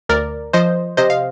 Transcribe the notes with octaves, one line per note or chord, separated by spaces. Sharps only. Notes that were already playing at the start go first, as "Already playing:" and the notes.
D2 A#4 D5
F3 C5 D#5
C3 C5 D#5
F5